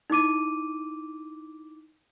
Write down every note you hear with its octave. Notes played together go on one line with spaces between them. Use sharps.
D#4 E4 D6 D#7